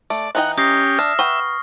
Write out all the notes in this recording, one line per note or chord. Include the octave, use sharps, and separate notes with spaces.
A3 D5
E3 D#4 F#5 G5
C#4 G4 D#6 A#6 C7
D4 E5 F6
B4 F#5 G5 C#6